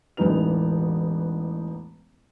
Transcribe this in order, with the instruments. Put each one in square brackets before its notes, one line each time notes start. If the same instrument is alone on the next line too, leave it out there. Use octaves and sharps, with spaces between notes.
[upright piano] E1 A1 E3 D#4 B4 F7